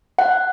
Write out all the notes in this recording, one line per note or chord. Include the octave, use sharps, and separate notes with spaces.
F#5